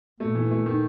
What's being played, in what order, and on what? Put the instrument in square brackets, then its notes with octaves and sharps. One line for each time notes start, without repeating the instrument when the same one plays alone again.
[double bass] A#2 [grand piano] A3
[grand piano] E3
A3
D#3